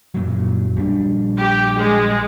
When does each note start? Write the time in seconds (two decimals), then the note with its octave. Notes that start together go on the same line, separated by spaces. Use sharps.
0.14 F#2 A#2 F#3
0.76 A#1 G3 D4
1.38 G4
1.76 G#3